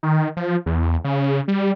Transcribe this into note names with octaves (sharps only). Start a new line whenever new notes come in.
D#3
F3
E2
C#3
G3